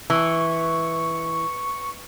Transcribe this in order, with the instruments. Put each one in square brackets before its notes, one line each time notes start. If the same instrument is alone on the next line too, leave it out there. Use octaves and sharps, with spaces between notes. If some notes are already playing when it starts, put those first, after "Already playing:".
[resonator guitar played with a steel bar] E3 [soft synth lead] C#6